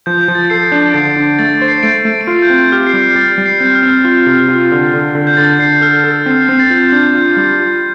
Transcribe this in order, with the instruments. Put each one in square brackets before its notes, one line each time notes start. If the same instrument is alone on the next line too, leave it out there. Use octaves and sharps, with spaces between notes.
[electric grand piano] F3 [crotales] G6
[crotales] G6
[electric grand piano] F3
[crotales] A6
[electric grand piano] A4 [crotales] C7
[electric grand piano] D4
[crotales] D7
[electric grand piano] D3 [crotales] C7
[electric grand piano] D4
[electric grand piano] A3 [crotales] A6
[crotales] A6
[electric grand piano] C5
[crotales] C7
[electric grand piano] A3 [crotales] A6 D7
[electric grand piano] A3
[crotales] D7
[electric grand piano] F4 [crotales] C7
[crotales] G6
[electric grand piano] C4
[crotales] G6
[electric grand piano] G4 [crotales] F6
[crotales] C7
[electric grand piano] G3
[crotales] C7
[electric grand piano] G3 [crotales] A6
[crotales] A6
[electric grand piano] G3
[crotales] C7
[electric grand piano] C4 [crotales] G6
[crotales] F6
[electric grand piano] C4
[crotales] F6
[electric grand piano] F4
C3
F4
D3
D3
D3
[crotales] G6
[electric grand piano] D3 [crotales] A6
[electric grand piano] D3 [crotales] C7
[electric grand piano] A4 [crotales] F6
[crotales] F6
[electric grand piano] A4
[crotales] A6
[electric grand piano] C4 [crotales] C7
[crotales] C7
[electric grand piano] C4 [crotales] C7
[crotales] A6
[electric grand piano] F4 [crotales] G6
[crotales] A6
[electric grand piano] D4 [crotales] G6
[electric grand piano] F4
G3
F4